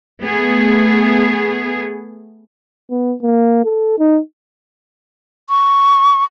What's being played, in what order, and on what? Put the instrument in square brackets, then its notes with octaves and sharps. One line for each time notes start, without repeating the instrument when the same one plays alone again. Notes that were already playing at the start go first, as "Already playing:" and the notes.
[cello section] A3 B3 G#4
[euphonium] B3
A#3
A4
D#4
[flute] C#6